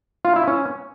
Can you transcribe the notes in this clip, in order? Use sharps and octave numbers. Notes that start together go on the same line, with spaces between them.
F4
E4
C#4